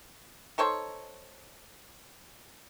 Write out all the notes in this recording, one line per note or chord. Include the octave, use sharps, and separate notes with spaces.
D#4 A4 C5 C#5